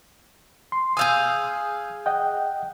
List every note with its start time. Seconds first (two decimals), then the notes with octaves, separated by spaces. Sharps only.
0.72 C6
0.97 G#4 F5 G#5 D#6 E6 G6
2.06 D#5 F#5 G5